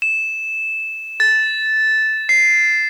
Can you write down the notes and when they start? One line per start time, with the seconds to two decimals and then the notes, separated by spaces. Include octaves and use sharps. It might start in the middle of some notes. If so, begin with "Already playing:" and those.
0.02 E7
1.20 A6
2.29 C7